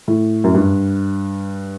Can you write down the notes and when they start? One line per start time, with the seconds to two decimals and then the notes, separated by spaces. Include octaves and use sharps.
0.08 A2
0.44 F#2
0.54 G2